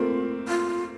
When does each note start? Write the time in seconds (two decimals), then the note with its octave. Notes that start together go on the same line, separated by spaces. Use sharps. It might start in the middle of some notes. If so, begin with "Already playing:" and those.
Already playing: A3 A#3 C4 F4
0.48 F4